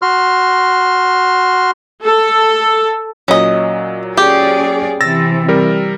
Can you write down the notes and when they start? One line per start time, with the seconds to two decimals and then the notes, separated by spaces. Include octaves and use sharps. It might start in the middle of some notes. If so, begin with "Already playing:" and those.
0.02 F#4 C6 F6
2.05 A4
3.28 A#2 F#3 C#4 D#5
4.17 C#4 G4 G#4 D5
5.01 C3 E3 E6 A6 A#6
5.48 G3 A#4